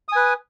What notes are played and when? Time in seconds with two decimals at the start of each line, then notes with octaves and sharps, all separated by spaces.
0.09 D#6
0.12 G#5
0.16 B4